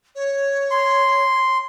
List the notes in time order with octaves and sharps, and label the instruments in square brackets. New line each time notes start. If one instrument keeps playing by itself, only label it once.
[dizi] C#5
[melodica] C6